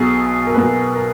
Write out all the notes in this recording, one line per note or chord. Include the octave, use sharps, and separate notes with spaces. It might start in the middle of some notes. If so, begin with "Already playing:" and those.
Already playing: B1 B2 F#3 G#4
A#4
B1 B2 F#3 B4
A#4